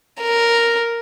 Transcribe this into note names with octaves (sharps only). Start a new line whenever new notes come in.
A#4